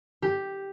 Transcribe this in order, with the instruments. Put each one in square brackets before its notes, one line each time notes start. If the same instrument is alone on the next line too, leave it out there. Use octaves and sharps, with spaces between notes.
[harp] G4